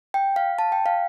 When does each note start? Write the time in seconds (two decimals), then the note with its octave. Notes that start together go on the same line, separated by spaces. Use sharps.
0.14 G5
0.36 F5
0.59 A5
0.72 G5
0.86 F5